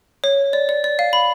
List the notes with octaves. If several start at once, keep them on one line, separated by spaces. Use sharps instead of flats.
C#5
D5
D5
D5
F5
B5